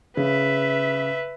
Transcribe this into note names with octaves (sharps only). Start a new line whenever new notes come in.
C#3 B4 E5